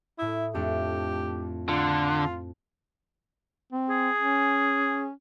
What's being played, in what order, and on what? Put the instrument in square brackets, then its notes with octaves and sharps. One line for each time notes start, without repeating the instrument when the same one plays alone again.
[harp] A2 D#6 [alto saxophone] E4
[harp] F2 A3 D4 [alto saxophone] G4
[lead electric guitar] D3 [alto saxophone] F4
[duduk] C4
[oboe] G#4
[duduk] C#4